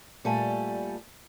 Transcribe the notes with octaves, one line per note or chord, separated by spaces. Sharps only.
A#2 G3 A3 A4 G#5